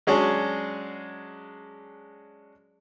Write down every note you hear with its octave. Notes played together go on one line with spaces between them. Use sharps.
F#3 G#3 C#4 D4 G#4